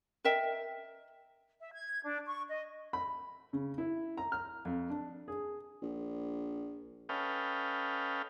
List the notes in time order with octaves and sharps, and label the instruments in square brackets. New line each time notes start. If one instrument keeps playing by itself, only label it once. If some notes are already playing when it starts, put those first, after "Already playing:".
[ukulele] A#4 D#5 E5 G5
[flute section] E5
G#6
D4
C#6
D#5
[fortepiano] B5
C#3
E4
A#5
F6
F2
D4
G#4
[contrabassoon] A#1
[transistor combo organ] C#4 A4 B4 D#5 F5 G5